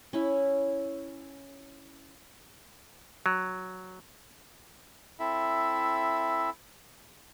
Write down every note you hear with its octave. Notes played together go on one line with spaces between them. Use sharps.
C#4 E4
F#3
C4 E4 A4 E5